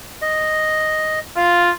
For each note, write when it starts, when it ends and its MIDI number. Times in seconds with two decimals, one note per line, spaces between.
0.22 1.19 75
1.37 1.72 65
1.37 1.63 77